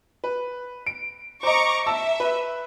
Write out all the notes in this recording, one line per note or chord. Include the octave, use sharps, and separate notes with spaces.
B4
D7
C5 D#5 A#5 C#6 D6
E5 A5 E6
B4